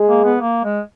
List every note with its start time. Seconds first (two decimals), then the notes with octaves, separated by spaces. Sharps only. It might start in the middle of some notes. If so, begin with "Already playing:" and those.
Already playing: G#3
0.08 A#3
0.25 B3
0.41 A#3
0.64 G#3